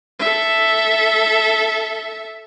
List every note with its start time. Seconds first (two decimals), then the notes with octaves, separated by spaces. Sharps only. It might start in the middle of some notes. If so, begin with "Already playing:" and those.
0.19 A4 E5